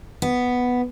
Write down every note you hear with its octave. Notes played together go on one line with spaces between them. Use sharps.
B3